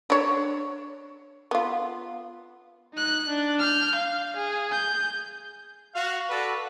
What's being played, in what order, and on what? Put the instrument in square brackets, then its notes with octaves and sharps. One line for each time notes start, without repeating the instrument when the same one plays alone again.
[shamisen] D4 C#5
B3 F4
[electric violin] D#4 F#6
D4
F6 G6
F5
G#4
G6
[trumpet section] F#4 F5
F#4 A4 B4 D5